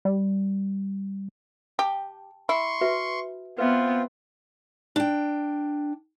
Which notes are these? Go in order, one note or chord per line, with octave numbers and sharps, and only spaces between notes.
G3
G4 A5
E4 C6 C#6
F#4 B4 E5
B3 C4 F4 B4 E5
D4 G5